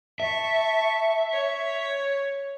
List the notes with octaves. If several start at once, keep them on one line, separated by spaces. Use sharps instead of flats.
E5 A5 C#6
C#5